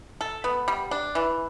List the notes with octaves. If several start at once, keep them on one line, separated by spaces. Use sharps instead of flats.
A4
B3
G3
D4
E3